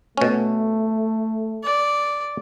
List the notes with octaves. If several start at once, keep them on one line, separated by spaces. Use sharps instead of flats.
B2 A3 C#4
D5